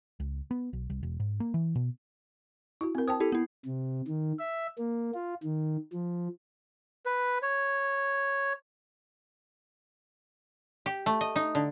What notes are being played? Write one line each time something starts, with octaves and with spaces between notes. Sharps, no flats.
C#2
B3
B1
C2
E1
G#2
A#3
E3
B2
E4 F#4
C4 A#4
C5 G5 A5 D#6
E4 G4 A4
B3 E4
C3
D#3
E5
A#3
F4
D#3
F3
B4
C#5
G4
A3
D#5
D#4
D3